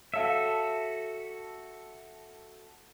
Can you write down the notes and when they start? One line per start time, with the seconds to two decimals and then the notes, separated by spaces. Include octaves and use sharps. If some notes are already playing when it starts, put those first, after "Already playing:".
0.14 F#4 A4 C#5 E5 F5